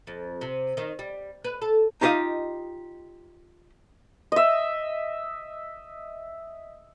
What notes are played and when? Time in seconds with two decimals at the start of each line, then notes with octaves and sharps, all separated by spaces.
0.07 F2
0.41 C3
0.77 D#3
0.99 G3
1.44 B4
1.62 A4
2.01 D#4 F4 G4 C5 D#5 F5
4.32 D#5 E5